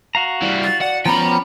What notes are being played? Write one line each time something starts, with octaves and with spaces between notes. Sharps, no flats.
F#4 F5 A#5
E3 G3
A6
D5 F#5
F3 B3 C#4 G5 A#5 B5